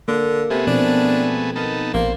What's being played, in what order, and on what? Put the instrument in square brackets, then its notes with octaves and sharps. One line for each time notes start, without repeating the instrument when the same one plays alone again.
[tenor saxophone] D3 [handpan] A#3
[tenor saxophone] C3 [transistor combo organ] A3 B3 G#4
[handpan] B2 F3 C4 [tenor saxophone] D4
[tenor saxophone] D#3 [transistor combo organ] B3 D#4 A4
[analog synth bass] A#1 [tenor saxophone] A#3 [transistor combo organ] C5